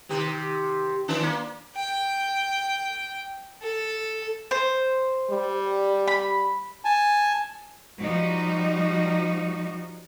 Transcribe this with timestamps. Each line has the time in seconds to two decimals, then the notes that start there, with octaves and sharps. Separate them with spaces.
0.09 C3 D#3 G4
1.08 D#3 F3 D4
1.22 A#3
1.75 G5
3.62 A4
4.51 C5
5.31 G3
6.07 B5
6.85 G#5 A5
8.00 F3 G3 D#4 F#4